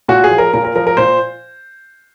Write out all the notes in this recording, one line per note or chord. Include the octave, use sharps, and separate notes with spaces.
A#2 F#4
G#4
F3
A#4
A#2 A#4
A#4
F3 A#4
A#4
A#2 C5